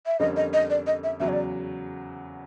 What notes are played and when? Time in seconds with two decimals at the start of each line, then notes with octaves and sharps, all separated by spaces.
0.06 E5
0.20 F2 D3 G3 A#3 C#4 D#5
0.36 D#5
0.53 D#5
0.70 D5
0.87 D#5
1.04 E5
1.20 E2 C#3 F#3 E5
1.28 C#5
1.33 D5